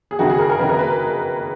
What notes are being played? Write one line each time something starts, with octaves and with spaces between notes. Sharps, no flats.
G#4
F#1 F2 D#3 F#4
G#4
A#4
A#4
F#1 F2 D#3 B4
A#4
B4